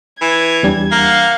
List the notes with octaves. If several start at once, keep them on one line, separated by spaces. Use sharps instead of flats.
E3 G#6
E2 G3 D4
A#3 F5 F#5